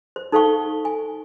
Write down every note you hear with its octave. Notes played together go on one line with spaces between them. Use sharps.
C5
D#4 A4 C5 F5 G5 C#6
G#5